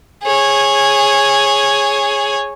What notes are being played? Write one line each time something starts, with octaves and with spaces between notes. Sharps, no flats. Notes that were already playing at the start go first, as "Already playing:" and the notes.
G#4 C#5